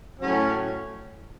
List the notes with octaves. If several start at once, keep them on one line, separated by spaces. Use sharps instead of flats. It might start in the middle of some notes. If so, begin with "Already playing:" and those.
A2 F#3 C#4